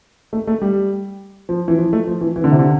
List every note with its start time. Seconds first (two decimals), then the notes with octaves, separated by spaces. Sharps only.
0.33 A3
0.47 A3
0.62 G3
1.49 F3
1.68 E3
1.78 F3
1.93 A3
2.07 F3
2.21 E3
2.36 E3
2.44 D3
2.52 C3
2.59 D3